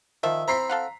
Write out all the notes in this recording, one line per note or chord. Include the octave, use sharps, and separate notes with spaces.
D#3 F3 E5
C4 E4 C5 A#5 B6 C7
A4 F5 F#5